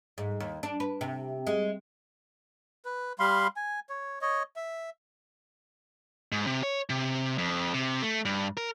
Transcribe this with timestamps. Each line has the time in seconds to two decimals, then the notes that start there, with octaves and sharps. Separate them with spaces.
0.18 G#2
0.40 D#2
0.63 D4
0.80 B4
1.01 C3
1.47 G#3
2.85 B4
3.19 G3 F5 B5 C6
3.56 G#5
3.89 C#5
4.21 C#5 D#5
4.56 E5
6.32 G#2
6.47 C3
6.63 C#5
6.90 C3
7.38 F2
7.74 C3
8.02 A3
8.25 G2
8.57 A#4